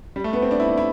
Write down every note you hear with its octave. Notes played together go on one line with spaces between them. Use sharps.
G3
A3
B3
C4
D4
E4
D4
E4